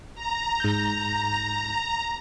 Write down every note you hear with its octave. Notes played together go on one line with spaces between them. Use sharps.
A#5
G#2 G6